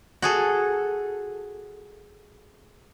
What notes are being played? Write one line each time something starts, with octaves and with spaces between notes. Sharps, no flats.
F#4 G#4 A4